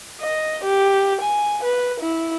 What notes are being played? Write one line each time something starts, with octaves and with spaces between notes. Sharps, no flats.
D#5
G4
G#5
B4
E4